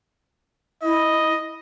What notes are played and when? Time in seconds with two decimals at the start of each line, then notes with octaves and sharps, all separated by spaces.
0.83 E4 D#5